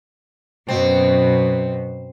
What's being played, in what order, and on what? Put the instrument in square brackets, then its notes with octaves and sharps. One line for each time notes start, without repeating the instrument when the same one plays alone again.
[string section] F#2 B2 [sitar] C4